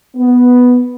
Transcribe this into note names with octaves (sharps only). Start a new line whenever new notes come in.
B3